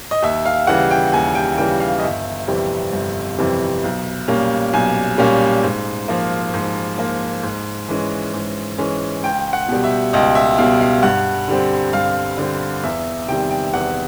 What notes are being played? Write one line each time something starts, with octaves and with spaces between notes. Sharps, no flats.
D#5
D#2 E5
F5
C#3 E3 G3 F#5
G5
D#2 G#5
G5
C#3 E3 G3 G5
F5
D#5
G1 E5
F2 C3 E3 G3
G1
F2 C3 E3 G3
B1
A#2 G3 A#3 C#4
B1 G#5
A#2 G3 A#3 C#4
G#2
F3 A#3
G#2
F3 A#3
G#2
E3 G#3 C#4
G#2
E3 G#3 C#4
C#2 G5
F#5
B2 G3
E5
C#2 D#5
E5
B2 G3 F5
F5
G2 F#5
D3 G3 C4
G2 F5
D3 G3 C4
E2 E5
C3 D#3 G3 G5
G5
E2 F#5